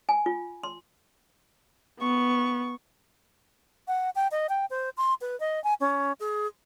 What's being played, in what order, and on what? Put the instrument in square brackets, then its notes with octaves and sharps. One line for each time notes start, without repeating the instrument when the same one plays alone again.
[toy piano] G#5
F4
C6
[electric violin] B3 [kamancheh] C#6
[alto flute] F#5
G5
D#5
G5
C5
C6
B4
D#5
G#5
C#4
G#4